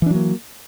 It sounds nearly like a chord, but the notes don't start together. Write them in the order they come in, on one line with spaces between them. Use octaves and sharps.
E3 D4 F#3 A#3